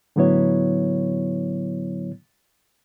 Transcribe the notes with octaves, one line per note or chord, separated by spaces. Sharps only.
A2 D3 F#3 B3 E4 C#5